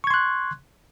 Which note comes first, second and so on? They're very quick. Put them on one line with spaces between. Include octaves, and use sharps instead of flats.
C#6 G#6 C6 F#6